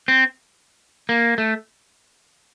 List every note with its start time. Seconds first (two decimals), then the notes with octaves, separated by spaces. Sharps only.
0.08 C4
1.09 A#3
1.38 A3